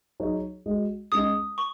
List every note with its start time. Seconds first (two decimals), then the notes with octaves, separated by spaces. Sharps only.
0.20 F#3 D#4 G#4 C#5
0.66 G#3 F#4 D#5
1.12 G#3 C#4 G#4 D#5 D#6
1.58 C#6